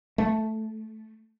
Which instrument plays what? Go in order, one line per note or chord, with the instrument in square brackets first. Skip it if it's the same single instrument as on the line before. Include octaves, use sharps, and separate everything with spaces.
[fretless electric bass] A3